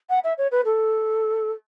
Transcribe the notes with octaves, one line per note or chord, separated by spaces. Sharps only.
F#5
E5
C#5
B4
A4